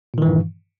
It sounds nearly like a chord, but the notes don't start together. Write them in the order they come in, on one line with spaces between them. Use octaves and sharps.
A#2 D#3 E3 G2